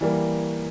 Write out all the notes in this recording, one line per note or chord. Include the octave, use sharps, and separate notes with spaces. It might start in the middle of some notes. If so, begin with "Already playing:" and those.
E3 G3 A#3